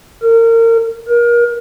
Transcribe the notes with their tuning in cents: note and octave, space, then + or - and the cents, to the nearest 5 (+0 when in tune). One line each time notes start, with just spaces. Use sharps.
A#4 -30
A#4 +30